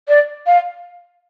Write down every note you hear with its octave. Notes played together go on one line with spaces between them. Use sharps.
D5
F5